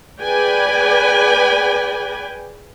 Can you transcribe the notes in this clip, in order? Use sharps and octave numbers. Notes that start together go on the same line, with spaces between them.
G#4 B4 D5 G5 G#5